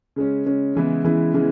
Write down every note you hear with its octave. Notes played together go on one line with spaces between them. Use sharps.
C#3 G#3 C#4
C#3 G#3 C#4
C#3 E3 G#3 B3 E4
C#3 E3 G#3 B3 E4
C#3 E3 G#3 B3 E4